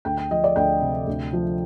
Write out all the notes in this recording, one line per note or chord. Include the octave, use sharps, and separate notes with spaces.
D2 G5
G5
F3 D#5
D5
D2 G5
C3
D2
F3